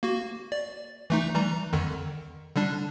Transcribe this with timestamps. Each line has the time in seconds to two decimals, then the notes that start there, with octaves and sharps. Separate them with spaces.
0.03 A#3 F#4
0.52 D5
1.10 E3 A3 D#4
1.34 E3 G3 A#5
1.73 F2 D3 D#3
2.56 D3 G3 D4